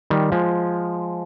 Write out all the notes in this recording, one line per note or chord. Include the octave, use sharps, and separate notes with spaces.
D#3 G3
F3 G#3